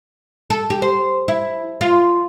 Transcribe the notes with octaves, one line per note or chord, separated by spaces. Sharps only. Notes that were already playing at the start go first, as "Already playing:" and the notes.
A4
G4
C5
E4
F4